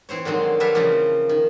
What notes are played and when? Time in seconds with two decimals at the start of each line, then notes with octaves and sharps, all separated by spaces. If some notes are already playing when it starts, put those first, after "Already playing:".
0.09 E3 C4 C5 C#5
0.25 D3 D#3 F#3 G#3 C4
0.60 G3 A4 B4 C#5 E5 F5
0.75 C#3 E3 F3 A#3
1.29 D#3